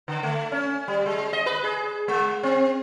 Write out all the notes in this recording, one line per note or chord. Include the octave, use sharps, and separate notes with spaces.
D3
A3
C#4
G3
G#3
D#5
B4
G#4
G#3
C4